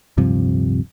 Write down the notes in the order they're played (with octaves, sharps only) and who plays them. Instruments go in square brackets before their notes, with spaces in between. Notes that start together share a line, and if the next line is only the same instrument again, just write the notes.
[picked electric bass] D1 G2 C3 F3